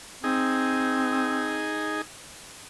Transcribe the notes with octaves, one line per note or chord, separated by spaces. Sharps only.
C4 D#4 G#4